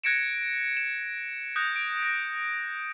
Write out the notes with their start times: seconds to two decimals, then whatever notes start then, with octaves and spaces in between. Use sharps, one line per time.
0.04 F#6 G#6 A#6 C#7 D7 E7
0.77 E7
1.56 D#6 F#6 G6 A#6
1.76 D7
2.03 A#6